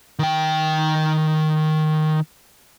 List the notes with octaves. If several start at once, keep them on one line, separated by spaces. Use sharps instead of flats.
D#3 G5